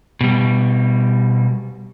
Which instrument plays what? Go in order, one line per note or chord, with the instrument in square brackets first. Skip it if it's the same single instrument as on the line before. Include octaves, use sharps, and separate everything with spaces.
[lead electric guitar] B2 G3